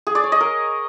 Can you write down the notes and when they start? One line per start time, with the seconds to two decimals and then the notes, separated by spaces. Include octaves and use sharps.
0.07 G#4
0.15 D5
0.24 C#5
0.32 D#5
0.41 A#4